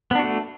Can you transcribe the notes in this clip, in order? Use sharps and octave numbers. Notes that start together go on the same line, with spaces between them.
A3 B3 D4 F#4